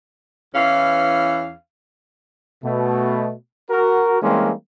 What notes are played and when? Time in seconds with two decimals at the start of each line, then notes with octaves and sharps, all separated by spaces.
0.55 E2 E3 C#4 F5
2.64 B2 A3
3.70 F#4 A#4
4.22 E3 G3 G#3 A#3 C4 C#4